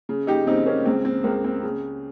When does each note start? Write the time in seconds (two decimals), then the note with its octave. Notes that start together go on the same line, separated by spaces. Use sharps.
0.09 C#3
0.27 D#4 G4
0.47 C#3 C4 D#4
0.66 A#3 C#4
0.85 C#2 C4
1.05 C4
1.24 C#2 A#3
1.44 C4
1.63 C#3